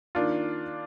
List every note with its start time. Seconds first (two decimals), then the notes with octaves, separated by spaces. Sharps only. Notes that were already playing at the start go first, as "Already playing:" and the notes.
0.15 D#3 A#3 D4 F4